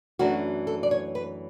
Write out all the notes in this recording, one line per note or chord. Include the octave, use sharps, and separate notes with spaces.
F#2 E3 A3 D4 F#4
A4
D5
C#5
B4